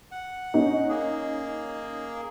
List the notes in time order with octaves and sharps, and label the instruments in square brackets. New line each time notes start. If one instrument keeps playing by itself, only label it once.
[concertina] F#5
[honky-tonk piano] C#4 D#4
[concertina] A#3 G#4